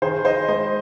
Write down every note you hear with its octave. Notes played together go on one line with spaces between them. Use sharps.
D#3 G#4 C5
C5 D#5
G#3 C5 D#5